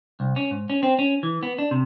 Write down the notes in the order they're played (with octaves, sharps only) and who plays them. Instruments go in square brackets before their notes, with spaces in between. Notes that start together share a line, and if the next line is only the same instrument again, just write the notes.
[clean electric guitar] C2
C#4
G#2
C#4
C4
C#4
E3
B3
D4
C3